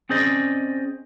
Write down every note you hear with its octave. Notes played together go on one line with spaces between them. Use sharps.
C4 C#4 G#4 C5 D5 D#5